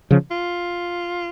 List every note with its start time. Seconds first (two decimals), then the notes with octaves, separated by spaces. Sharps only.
0.11 C#3 F3
0.31 F4